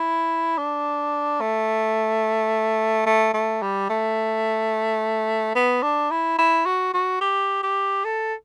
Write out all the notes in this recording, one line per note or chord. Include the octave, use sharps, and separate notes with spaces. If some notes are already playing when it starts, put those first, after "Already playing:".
Already playing: E4
D4
A3
A3
A3
G3
A3
B3
D4
E4
E4
F#4
F#4
G4
G4
A4